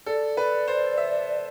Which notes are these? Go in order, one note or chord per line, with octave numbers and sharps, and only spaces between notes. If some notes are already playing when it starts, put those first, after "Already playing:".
A4 D5
B4
C5
E5